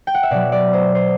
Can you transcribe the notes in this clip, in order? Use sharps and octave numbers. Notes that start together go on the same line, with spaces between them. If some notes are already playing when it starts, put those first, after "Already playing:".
G5
F#5
E5
B2 F#3 D5
D5
C5
C5